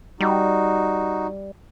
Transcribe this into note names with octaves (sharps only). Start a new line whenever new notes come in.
G3 D#4 F#4